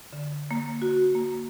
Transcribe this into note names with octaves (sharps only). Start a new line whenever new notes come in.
D3
A#3
F#4
A#3